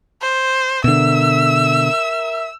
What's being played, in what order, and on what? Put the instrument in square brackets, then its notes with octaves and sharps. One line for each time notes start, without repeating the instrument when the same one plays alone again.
[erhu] C5
[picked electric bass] B2 D3 [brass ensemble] A#4 E5 [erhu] E6